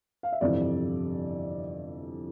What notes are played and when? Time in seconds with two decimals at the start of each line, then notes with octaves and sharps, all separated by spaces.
0.23 F5
0.32 E5
0.41 G1 F2 C3 E3 D5